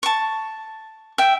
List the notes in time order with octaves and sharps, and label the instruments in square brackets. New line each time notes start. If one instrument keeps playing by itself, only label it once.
[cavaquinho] A5 C#6
[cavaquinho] E5 [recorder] G5